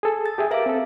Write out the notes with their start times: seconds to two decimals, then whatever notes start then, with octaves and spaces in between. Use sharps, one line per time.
0.03 G#4 A4
0.26 A6
0.38 G4 G#4 E5
0.51 A#4 B4 E5 F5 D6
0.66 C4 A4